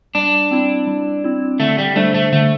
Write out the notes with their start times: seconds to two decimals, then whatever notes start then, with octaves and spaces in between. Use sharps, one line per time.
0.15 G3 D4
0.51 C4 E4
0.87 G3
1.24 C4 E4
1.60 D3 A3
1.78 G3
1.96 G3 A3 D4 C5
2.14 A3
2.32 D3 A3